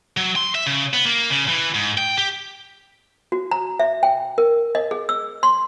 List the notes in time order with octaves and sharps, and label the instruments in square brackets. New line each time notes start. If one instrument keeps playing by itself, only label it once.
[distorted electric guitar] F#3
C6
E5
C#3
B3
A#3
C#3
E3
G#2
G5
G4
[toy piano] F#4
A#5
E5
G5
A#4
D#5
G#4
E6
C6